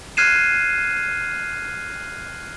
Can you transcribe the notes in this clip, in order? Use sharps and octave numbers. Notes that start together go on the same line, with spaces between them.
F6 F#6 G#6 C7 D#7 E7